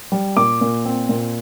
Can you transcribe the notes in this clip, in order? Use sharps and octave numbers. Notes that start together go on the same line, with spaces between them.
G3
A#2 D6
A#2
C4
A#2